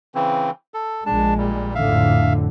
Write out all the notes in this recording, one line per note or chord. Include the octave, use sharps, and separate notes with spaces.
C#3 E3 C4
A4
A#1 G#3 D4 A5
A#2 G3
F2 A2 D3 E5 F5